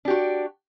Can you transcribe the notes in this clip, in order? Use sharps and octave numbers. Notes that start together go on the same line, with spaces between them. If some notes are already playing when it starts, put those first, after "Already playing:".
D4 F#4 G4